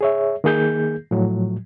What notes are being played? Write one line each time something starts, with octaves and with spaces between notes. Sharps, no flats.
G#4 C#5 E5
D#3 A#3 G#4 G6
A2 F3 F#3